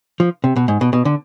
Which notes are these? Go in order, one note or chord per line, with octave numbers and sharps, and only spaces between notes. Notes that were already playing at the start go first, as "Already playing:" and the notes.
F3
C3
B2
G#2
B2
B2
D3